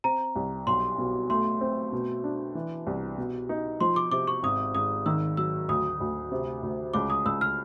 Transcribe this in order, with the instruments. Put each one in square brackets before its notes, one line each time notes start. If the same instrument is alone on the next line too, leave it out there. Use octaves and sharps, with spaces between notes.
[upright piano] C4 [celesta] A#5
[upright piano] C2
[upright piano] B1 [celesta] C6
[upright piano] B2
[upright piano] A3 [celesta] C6
[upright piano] C4
B2
D4
E3
C2
B2
D#4
[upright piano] F3 [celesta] C6
[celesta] D6
[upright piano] C3 [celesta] D6
[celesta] C#6
[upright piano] G#1 [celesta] D#6
[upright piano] G#1 [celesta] D#6
[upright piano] D#3 [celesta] E6
[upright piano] F#3 [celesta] E6
[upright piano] D2 [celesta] D#6
[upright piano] D2
C3
D2
[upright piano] C#2 [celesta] D6
[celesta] D#6
[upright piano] C#2 [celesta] E6
[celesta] F6